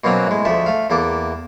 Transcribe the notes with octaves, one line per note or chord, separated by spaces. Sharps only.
B2 F#3 A#3 C4 C#4 F#4
A2 G#3
D2 F3 A3 E5
A3 F5
E2 A#3 A4 D6